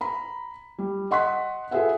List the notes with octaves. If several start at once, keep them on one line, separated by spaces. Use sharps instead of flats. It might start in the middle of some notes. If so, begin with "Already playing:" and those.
A#5 B5
G3
D#5 F#5 C6 F#6 B6
F4 G#4 A4 B4 E5 F#5